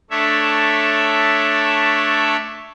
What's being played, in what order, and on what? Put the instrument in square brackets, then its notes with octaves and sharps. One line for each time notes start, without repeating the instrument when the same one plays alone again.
[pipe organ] A3 D4 C#5 E5